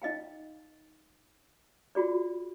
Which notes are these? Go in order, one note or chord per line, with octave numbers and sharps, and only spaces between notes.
D#4 D#5 F5 G5
F4 F#4 G#4 D5